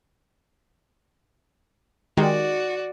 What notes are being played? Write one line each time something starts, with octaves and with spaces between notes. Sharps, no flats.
D#3 G#3 F#4 G4 D5